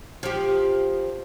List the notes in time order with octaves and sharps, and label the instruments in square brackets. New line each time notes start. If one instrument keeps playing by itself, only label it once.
[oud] F3 G4